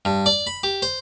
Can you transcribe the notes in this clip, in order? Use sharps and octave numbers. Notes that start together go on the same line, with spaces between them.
G2
D5
B5
G4
C5